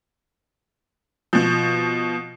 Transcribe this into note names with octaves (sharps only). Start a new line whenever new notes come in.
B2 F3